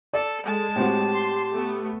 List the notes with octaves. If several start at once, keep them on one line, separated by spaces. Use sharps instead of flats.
A4 D5
G#3 A4 A5
A2 C4 F#4 G4
C6
A3 B3